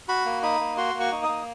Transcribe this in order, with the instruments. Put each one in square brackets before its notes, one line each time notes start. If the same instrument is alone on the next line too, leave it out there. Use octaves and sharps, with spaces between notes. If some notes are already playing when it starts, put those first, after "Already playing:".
[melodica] F#4 B5
A#3
D#4 B5
A#3
F#4 C6
A#3
C#6
D#4
D#6
A#3